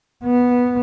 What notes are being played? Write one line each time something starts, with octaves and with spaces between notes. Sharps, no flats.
B3